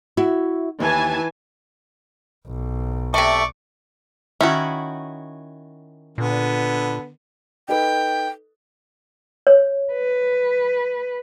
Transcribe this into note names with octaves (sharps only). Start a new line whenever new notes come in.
E4 F#4 E5
D#2 E3 G#5 A5
B1
C3 A3 D5 C#6
D#3 C#4 E4 F#4
A#2 D3 B3
D#4 A4 B4 G5
C#5
B4